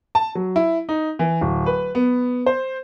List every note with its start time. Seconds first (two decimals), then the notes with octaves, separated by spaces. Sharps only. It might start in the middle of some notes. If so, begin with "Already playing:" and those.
0.15 A5
0.35 F#3
0.56 E4
0.89 D#4
1.19 E3
1.41 D1
1.66 B4
1.95 B3
2.46 C5